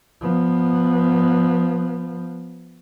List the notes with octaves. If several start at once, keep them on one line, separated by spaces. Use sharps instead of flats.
F3 B3